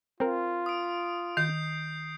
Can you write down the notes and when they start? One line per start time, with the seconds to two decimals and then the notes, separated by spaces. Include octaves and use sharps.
0.20 C4 F4 A#4
0.66 D#6 D7
1.37 D#3 G6 C7